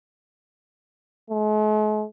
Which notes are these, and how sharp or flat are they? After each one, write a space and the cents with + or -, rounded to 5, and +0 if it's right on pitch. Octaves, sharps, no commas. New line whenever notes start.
G#3 +45